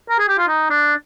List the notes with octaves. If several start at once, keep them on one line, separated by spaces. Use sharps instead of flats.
A#4
G#4
G4
F4
D#4
D4